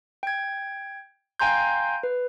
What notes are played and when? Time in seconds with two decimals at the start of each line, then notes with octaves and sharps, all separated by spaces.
0.23 G5 G#6
1.40 F5 G5 G#5 A#5 C6 G6
2.03 B4